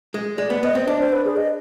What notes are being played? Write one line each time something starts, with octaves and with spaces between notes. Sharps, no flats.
G#3
G#3 D5
B3
B3 D#5
C4
D4 D5
C5
B4
G#4
D#5